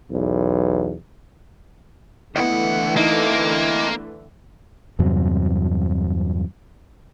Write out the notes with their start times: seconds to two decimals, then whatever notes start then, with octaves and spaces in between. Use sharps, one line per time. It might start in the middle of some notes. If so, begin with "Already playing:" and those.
0.11 B1 E2
2.36 C#2 D3 E3 A3 B3 E4 D#5 F#5
2.96 A#3 D#4 E4 A4 D#5
4.99 E2 G2 C3 F#3